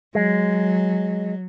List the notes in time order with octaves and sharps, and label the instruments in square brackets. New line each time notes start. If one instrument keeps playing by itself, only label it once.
[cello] F#3 [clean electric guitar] G#3